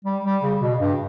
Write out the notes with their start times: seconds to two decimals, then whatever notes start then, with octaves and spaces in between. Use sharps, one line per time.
0.04 G3
0.24 G3
0.42 C#3
0.61 B2
0.79 G2